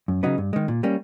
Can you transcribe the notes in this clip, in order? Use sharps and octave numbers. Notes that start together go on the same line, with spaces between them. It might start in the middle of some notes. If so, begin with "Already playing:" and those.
F#2
C#3 F#3 B3 D#4
G2
D#3 G#3
A#2
G3 A#3 C#4